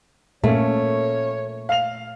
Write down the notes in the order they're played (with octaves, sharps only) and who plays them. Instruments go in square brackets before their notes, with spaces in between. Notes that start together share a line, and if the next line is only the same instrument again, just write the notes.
[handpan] A#2 [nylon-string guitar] A3 [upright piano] A#3 C#4 [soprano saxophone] C#5
[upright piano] F5 F7